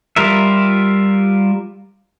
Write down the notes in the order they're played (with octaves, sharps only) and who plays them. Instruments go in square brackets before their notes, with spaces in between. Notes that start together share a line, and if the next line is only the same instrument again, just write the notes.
[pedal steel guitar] G3 F4 A#4 E5